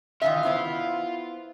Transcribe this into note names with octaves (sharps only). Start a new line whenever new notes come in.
D#3 E3 F4 E5
B3 E4 C5